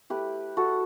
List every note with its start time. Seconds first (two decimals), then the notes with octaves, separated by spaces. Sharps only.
0.10 A3 E4 G4 B4
0.57 F#4 A4